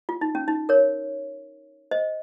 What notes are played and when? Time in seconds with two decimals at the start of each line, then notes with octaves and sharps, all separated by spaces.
0.09 F4
0.21 D#4
0.35 C#4
0.48 D#4
0.69 A#4 C#5
1.91 C5 D#5